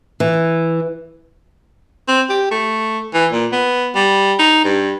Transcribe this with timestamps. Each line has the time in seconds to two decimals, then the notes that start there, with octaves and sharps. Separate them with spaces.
0.20 E3
2.08 C4
2.29 G4
2.51 A3
3.14 E3
3.32 A#2
3.52 B3
3.95 G3
4.39 D#4
4.65 G2